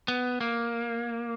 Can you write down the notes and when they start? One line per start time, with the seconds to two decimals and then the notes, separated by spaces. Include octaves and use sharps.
0.08 B3
0.41 A#3